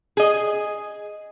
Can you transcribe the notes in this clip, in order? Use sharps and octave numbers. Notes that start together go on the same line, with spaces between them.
G#4 D#5